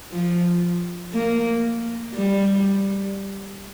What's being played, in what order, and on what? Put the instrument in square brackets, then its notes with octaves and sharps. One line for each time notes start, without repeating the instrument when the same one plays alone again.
[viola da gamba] F3
A#3
G3